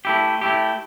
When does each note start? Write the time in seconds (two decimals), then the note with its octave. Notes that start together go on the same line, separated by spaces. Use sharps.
0.05 A3 E4 G4
0.41 A3 E4 G4